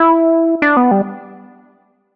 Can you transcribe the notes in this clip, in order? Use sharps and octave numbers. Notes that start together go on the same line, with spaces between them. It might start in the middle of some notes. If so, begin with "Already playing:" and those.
Already playing: E4
D4
B3
G3